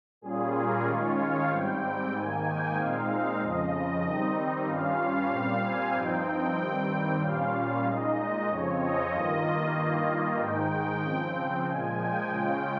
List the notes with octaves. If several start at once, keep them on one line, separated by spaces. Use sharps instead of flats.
A#2 G3 C#4 F4 G#4
A#4
D#3 G#3 C#4 F4 C#5
F5
G#2 G3 C4 G5
G#2 D#3 A#3 G#5
G5
A#2 G#3 C4 D#4 F5
F2 C#3 F3 D#5
D#3 G3 C4 D#4
G2 G3 C#4 F4 F5
A#2 G3 C4 F5
G#5
G2 F3 C4 D#4 G5
G2 D#3 G3 C4
A#2 G3 C#4 F4 F5
F5
A#2 G#3 D#4 D#5
F2 C#3 F3 C4 C#5
D#5
G2 D#3 A#3 F4
G2 D#3 A#3 F4
G#2 D#3 G#3 D#4 G5
C#3 F3 C4
A#2 F3 G#3 G#5
G5
C#3 G#3 C#4 F4